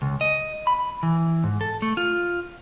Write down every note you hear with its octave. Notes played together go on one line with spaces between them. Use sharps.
C#2
D#5
B5
E3
G#2
A4
A3
F4